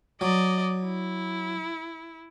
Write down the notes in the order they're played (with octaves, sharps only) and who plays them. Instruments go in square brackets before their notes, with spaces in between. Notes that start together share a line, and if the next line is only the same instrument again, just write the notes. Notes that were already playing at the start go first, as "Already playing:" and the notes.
[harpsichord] F#3 [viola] D5 D#5
[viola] E4